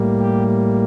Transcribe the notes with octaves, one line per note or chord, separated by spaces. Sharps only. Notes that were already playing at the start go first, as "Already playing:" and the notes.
Already playing: A2 G3 A#3
G4